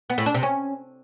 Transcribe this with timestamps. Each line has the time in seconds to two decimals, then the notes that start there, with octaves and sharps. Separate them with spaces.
0.10 B3
0.18 A2
0.26 D4
0.34 C3
0.43 C#4